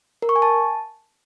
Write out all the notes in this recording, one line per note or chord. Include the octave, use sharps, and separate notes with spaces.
A#4
C#6
G#5
A5